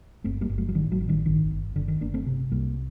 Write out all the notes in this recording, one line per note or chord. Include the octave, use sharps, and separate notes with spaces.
G1 A3 C4
G3 A#3
G1
F#3 A3
F#3
A1 D#3 G3
F#3 A3
A1
D#3 G3
G1 D#3
G1
G1 D3
D#3
G1 A#3 D4
A3 C4
C3
C2 G3 A#3